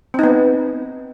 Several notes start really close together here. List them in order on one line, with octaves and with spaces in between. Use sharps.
C4 D#4 B3